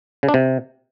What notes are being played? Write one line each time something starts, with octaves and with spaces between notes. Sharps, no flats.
C#3
D4
C3